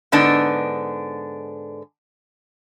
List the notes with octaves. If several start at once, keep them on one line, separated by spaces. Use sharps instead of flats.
G#2 D3 B3 D4 D#4